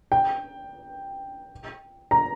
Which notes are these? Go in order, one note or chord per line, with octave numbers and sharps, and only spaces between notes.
G5
A#5